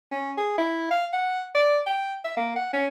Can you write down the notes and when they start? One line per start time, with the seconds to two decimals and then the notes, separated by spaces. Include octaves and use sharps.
0.11 C#4
0.37 G#4
0.58 E4
0.91 F5
1.13 F#5
1.55 D5
1.86 G5
2.24 E5
2.37 A#3
2.56 F#5
2.73 C#4